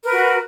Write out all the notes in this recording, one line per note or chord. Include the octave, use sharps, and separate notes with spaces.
F#4 A#4 B4